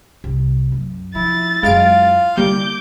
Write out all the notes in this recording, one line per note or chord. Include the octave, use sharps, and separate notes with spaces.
C2
F#2
F3 E4 A6
F#2 G#3 E4 F4 F5 F6 D7
D3 G3 A#3 D6 G6